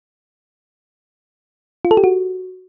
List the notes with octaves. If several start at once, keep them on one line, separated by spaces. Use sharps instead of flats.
F4
A4
G4
F#4